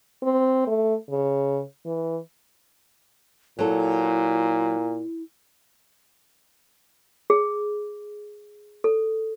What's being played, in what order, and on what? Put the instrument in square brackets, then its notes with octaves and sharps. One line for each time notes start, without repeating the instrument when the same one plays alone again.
[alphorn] C4
A3
C#3
E3
[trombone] A#2 [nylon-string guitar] F#3 A4 [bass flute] E4
[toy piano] G#4
A4